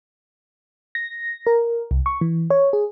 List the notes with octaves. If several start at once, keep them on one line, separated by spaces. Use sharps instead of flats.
A#6
A#4
C2
C#6
E3
C#5
G#4